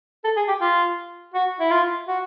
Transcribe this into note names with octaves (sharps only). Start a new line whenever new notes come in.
A4
G#4
G4
F4
F#4
E4
F4
F#4